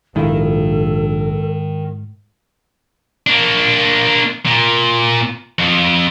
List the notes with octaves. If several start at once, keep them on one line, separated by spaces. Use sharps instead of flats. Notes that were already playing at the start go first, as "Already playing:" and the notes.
A#1 G#2 D#3 E4 F4 A4
A#3 D4
A#2
F2